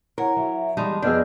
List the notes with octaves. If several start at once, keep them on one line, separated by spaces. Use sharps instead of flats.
E4 A#4 C#5 F#5 A#5
F#3 E5
E3 G3 G#3 D#4 A5 C6 D#6
F2 B3 D4 G#4 D#5 E6 F6 G6